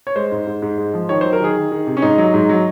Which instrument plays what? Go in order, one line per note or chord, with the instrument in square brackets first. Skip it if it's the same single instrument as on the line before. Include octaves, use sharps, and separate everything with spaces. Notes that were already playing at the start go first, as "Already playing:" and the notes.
[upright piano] C#5
G#3 C5
G#2
G#2
G#2
G#3
F3
D#3 C#5
F#3 C5
A#4
D#3 G#4
D#3
D#3
C3
C#4
G#2 D#4
F#3
G#2
F#3